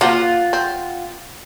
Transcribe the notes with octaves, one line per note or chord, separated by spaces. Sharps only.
A#3 F4 F#4 C5 F#5
C4